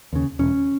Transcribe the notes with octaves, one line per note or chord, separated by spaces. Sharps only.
D#2 C#3
E1 C#4